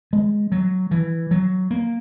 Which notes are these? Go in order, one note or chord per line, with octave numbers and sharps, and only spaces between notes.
G#3
F#3
E3
F#3
A#3